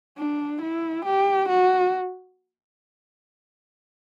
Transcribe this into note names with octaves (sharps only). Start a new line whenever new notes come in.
D4
E4
G4
F#4